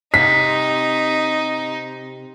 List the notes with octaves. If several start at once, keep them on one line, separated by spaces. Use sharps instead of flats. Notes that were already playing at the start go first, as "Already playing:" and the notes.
C3 D#4 B6